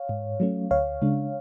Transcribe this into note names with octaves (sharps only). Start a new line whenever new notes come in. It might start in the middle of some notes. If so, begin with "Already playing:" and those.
Already playing: C#5 F5
G#2
F#3 A3 C#4
D2 C#5 F5
C#3 G#3 D4